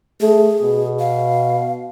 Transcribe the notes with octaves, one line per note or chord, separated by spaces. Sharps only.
A3 G#4
B2
F5